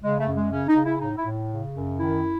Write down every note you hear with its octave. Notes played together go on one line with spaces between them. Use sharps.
C#3 G#3
A3
F#2
G#3
C#3 C#4
D#4
C#3
E4
A2 D#4
E4
A2
C#3
F#2
D#3 E4